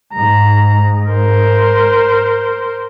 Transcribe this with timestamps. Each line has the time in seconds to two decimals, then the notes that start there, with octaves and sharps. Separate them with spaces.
0.14 G#2 A#5
1.10 A#4 C5